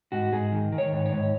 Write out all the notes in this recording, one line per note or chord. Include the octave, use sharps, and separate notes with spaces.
G#2 F#4
G#2 G#4
D#3
D#3
C#5
G#2
C#5
G#2